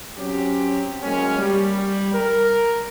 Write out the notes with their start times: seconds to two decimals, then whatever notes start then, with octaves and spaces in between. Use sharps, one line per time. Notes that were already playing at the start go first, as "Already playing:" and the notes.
0.18 F#3 C4 C#4 G4
1.02 F#3 G#3 A#3 C#4
1.38 G3
2.13 A#4